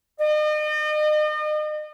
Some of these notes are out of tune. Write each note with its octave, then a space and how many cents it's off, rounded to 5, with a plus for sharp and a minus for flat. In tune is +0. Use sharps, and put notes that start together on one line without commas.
D#5 -40